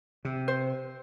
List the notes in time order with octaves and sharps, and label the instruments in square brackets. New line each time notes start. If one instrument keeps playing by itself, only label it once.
[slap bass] C3
[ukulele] C5